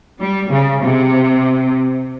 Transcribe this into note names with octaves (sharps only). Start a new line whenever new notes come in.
G3
C#3
C3